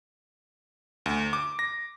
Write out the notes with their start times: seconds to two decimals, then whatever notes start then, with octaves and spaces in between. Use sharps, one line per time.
1.06 D2
1.33 D6
1.59 A#6